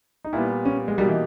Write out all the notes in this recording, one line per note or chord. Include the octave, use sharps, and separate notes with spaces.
D#4
A#2 G3 B3 E4
C#4
G#3
B2 G3 A#3 D#4 G4
E3